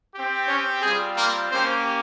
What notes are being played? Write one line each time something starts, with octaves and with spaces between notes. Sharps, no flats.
C4 G4
C#4 C#5
G3 C4 F4 G#4
A#3 A#4
A#3 C4 C#4 G4 C5